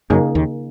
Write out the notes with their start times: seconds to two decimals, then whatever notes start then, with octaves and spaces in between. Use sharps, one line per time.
0.10 F#2 C#3 F#3 A#3 D#4 G#4
0.35 D#2 D#3